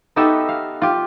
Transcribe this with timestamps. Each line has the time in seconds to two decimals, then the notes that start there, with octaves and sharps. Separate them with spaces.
0.16 B3 D#4 F#4 G4 A4 E5
0.49 F5
0.82 F4 G4